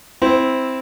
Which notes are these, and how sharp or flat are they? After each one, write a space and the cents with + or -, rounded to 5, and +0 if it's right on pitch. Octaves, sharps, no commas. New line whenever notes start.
C4 +0 E4 -5